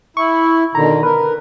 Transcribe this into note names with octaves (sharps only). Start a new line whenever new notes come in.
E4 C#6
B2 D3 D#3 A#5
A#4 B4